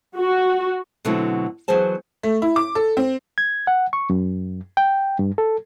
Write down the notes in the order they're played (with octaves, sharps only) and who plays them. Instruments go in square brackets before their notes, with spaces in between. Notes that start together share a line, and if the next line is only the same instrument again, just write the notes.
[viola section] F#4
[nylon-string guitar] B2 D3 F#3 A3 C4 E4
E3 F#3 B3 G#4 C5 A5
[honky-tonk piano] A3
E4
D6
A4
C4
[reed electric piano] G#6
F#5
C#6
F#2
G5
G2
A4